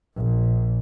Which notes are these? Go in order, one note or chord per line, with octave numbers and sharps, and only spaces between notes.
A#1